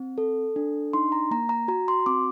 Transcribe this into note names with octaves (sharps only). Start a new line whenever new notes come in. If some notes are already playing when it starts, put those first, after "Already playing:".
Already playing: C4
A4
D4
D#4 C6
A#5
A#3 A#5
A#5
F#4 A#5
C6
C4 D6